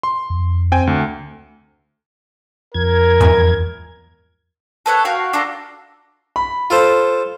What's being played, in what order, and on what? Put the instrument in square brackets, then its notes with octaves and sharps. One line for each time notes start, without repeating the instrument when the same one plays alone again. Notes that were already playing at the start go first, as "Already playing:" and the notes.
[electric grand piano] C6
[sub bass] F2
[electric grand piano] C4 G5 G#5
D2
[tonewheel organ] F2 G#6 [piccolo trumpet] A#4
[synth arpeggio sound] E2 G#2 G#5
[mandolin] A4 B4 C#5 F#5
F#4 F5 G5
D4 F4 A4 A#5
[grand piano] B5
[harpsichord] F4 A4 C5